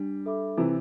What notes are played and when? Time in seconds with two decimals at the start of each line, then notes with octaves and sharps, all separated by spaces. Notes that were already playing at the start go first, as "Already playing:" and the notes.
Already playing: G3 D4
0.26 A4 E5 B5 D6
0.57 C3 E3 C5